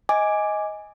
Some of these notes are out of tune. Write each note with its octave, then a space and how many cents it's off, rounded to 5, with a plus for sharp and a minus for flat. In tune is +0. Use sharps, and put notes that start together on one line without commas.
D#5 +15 G#5 +0 D6 +0